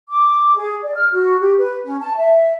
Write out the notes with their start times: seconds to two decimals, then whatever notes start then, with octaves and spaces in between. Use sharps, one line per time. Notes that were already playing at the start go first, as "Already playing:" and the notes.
0.11 D6
0.56 G#4
0.83 D5
0.95 F6
1.12 F#4
1.39 G4
1.58 B4
1.85 C#4
2.00 A5
2.17 E5